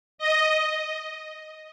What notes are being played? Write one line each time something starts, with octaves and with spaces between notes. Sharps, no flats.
D#5